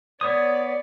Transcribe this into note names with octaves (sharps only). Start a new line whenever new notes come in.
B3 C#5 D5 D#6